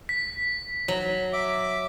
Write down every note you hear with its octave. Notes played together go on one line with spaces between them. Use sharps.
B6
F#3
E5 D6